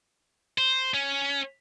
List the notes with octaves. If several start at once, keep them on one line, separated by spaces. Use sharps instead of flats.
C5
C#4